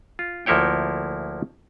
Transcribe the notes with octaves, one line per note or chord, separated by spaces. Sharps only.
F4
D2 F3 A#3 E4 C#5 G5